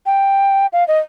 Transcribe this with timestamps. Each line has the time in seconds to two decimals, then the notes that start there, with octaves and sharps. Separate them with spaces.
0.06 G5
0.73 F5
0.88 D#5